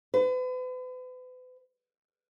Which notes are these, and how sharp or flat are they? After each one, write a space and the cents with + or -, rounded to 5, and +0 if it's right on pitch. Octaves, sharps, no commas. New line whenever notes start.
B4 +40